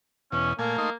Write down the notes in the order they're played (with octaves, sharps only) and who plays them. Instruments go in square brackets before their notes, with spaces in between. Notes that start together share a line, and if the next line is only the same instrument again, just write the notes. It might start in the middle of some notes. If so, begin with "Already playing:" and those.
[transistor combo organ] E2 B2 [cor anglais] C#4
[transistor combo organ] A#2 A3 G#5 [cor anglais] A#3
[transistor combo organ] A3 D#4 C6